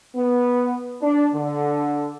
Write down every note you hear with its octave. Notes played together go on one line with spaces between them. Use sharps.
B3
D4
D3